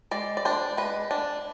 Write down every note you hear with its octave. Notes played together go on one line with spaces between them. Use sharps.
G#3 D5
D5
D4 C5
G#3 B4
D4